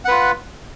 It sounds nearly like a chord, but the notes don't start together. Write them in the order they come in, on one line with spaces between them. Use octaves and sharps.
F#5 B4 F4